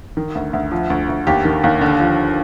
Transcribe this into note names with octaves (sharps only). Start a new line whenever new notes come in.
D#3
D2
D2
F3
D2
D2
D#2 G4
D#3
D#2
D3
F3